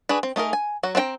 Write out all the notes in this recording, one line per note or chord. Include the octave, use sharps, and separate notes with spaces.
D4 F#4 G#4 B4
C4
A3 D#4 G#4 A#4
G#5
F#3 F#4
C4 D4 F#4 G5 A#5